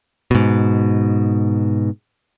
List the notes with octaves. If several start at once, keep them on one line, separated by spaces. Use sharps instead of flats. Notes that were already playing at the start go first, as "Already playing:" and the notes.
G#2 B2